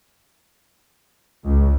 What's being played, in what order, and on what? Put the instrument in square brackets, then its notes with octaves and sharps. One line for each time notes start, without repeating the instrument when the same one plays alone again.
[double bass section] C#2